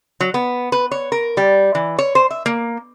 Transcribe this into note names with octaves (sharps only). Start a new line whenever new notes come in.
F#3
B3
B4
C#5
A#4
G3
E3
C#5
C5
E5
A#3